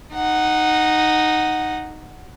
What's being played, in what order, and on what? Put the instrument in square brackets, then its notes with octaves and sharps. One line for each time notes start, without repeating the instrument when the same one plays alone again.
[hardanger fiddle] D#4 F#5